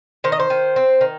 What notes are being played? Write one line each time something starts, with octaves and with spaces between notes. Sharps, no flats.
D#3 C5
D#5
C5
D#3
C4
D#3